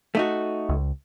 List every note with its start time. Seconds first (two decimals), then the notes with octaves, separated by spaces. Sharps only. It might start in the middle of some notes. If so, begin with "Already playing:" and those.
0.15 A3 D#4 F#4
0.69 C#2